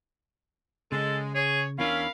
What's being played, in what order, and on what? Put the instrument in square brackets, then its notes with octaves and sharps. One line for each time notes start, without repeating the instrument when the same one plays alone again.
[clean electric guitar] C#3 [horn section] G#3 [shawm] A4
[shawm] G#4 [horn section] C#5
[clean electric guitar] E2 D4 E5 [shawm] C#4 [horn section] A#4 F5 B5